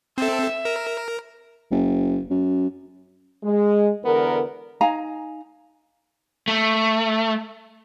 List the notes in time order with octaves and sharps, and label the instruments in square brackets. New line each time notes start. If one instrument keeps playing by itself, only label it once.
[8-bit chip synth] C4 A4 [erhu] E5
[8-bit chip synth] A#4
[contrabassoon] F#1
F#2
[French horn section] G#3
E2 D3 B3 A#4
[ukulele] D#4 F5 G#5 A#5
[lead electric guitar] A3